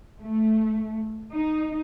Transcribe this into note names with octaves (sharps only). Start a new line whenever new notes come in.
A3
D#4